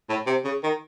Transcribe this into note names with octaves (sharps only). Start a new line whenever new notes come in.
A2
C3
C#3
D#3